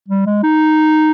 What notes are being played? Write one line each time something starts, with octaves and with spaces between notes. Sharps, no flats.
G3
G#3
D#4